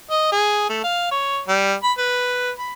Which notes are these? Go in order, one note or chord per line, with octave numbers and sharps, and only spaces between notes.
D#5
G#4
A3
F5
C#5
G3
B5
B4
B5